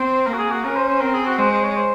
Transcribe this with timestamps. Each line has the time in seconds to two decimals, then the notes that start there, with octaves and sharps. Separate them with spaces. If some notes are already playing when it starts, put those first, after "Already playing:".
Already playing: C4 C5
0.27 A#3 A#4
0.33 F#4
0.39 G#4
0.51 F#4
0.64 C#4 A#4
0.76 C5
0.89 C5
1.01 C4 A#4
1.14 G#4
1.26 F#4
1.38 G#3 C5
1.51 C5
1.63 C#5
1.76 C5